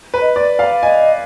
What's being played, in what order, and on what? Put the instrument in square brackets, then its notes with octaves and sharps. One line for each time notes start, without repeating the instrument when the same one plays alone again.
[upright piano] B4
[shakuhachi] D#5
[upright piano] D5
[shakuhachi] D5
[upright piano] F5
[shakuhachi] D#5 [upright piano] G#5